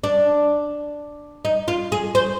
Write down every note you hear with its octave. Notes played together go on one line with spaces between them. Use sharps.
D4
D#4
F4
G#4
C5